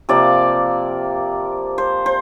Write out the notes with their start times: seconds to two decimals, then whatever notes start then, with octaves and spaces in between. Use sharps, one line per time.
0.09 C3 F3 A#3 D5
1.78 C5
2.06 C5